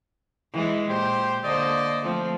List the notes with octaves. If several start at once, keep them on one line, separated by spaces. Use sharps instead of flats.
E3 G#3
A#2 G4 C5
D3 A#3 C5 D5 D#5
F3 A3 C4